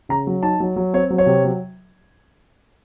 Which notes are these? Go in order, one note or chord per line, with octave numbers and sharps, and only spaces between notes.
C#3 A#5
F#3
D#4 A5
F#3
F#3
C4 C#5
F#3
C#5
C3
F#3